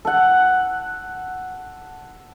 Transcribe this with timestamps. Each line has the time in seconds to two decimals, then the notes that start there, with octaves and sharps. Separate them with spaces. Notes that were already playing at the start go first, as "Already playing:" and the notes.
0.05 A4 F#5